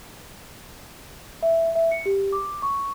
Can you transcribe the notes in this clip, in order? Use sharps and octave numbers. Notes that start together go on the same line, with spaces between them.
E5
E5
C#7
G4
D6
C#6